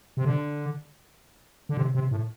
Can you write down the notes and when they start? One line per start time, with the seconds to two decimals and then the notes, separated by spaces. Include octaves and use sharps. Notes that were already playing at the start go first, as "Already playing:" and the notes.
0.17 C3
0.25 D3
1.69 D3
1.77 C3
1.95 C3
2.11 A2